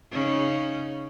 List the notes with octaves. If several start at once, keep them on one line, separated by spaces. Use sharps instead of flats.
C#3 C#4 D#4